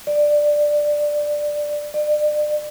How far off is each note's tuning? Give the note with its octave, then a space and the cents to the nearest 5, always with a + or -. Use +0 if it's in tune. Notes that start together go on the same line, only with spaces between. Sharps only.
D5 +10
D5 +35